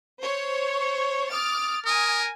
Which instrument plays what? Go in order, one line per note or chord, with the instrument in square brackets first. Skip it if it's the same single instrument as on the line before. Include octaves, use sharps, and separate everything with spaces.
[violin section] C5 C#5
[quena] C#6
[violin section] D6 F6 A6 [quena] D#6
[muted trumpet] A#4 [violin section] G#5 [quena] D#6